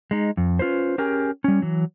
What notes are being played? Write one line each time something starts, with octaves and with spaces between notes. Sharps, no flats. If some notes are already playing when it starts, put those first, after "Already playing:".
G#3 D#4
F2
C#4 F4 B4 C5
C#4 G4 G#4 A#4 G#5
G3 C#4
E3 F#3